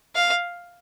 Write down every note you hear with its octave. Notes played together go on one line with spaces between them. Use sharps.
F5